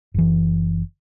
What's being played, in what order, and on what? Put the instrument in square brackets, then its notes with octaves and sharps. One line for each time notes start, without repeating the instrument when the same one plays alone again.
[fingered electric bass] F#1 E3